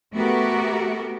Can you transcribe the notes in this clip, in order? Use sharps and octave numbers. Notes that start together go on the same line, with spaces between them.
A3 B3 F#4 G4 A#4